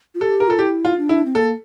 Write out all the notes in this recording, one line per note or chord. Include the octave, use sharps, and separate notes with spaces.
F4
G4 A4
A#4
F4 A4
E4 G4
F4
D4
E4
C4
A#3 A4